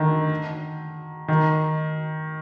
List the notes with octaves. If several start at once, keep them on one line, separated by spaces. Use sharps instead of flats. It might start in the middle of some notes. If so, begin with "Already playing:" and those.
Already playing: D3 D#3
D#3